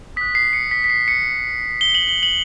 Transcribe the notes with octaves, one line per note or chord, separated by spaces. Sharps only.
D#6 F#6 B6
C7
C#7
B6
B6
C7
C#7
G7
F#7
G7
F#7